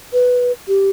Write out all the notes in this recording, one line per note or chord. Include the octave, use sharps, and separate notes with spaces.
B4
G4